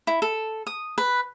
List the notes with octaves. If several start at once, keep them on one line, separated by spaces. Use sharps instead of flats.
E4
A4
D#6
B4